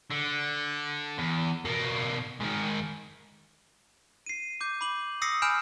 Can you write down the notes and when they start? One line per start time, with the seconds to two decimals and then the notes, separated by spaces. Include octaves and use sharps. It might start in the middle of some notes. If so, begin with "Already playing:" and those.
0.11 D3
1.18 E2
1.65 B2 A#3
2.40 G#2 D#3
4.26 C7 D#7
4.61 D6 G6
4.81 B5 D6 F#7
5.22 D#6 E6 A#6 C7 C#7
5.42 G#5 B5 F6 G6 D7 E7